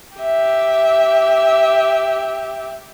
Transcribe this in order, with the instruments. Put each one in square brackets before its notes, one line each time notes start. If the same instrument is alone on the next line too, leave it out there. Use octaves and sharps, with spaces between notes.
[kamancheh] G4 E5